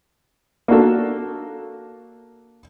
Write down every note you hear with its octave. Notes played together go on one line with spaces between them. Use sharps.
A#3 D4 F#4 A4